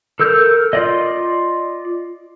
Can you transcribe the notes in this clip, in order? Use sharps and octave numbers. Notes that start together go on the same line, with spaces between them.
A4 A#4 E6 G6
F4 D5 D#5